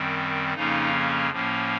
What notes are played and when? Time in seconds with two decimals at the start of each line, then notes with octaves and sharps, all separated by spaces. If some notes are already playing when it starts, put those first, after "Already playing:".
Already playing: F#2 D#3 G3 C4
0.54 F2 C#3 F3 A#3 C#4 D#4
1.31 A2 F3 A#3 C#4